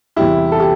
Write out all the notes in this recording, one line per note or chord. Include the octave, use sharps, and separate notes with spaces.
E2 C3 G3 E4 G4
A4
G4